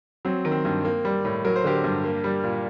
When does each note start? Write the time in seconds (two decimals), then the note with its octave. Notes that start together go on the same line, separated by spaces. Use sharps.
0.25 F#3 C4
0.45 D#3
0.52 C4
0.65 G2
0.85 A#3
1.05 G3
1.25 A2
1.45 F#3 A#4
1.56 C5
1.64 D3 G4 A#4
1.84 G2
2.04 A#3
2.24 G3
2.44 A#2